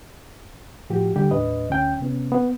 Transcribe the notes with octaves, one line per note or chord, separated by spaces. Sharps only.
A2 F3 F#4 G4
D3 G3 G4
D#2 A2 D4 B4 D#5
D2 C#4 G5
C3 B3 C#4
B3